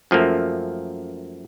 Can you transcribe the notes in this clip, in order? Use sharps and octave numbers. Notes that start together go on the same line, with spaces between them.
F#2 F3 A3 A#3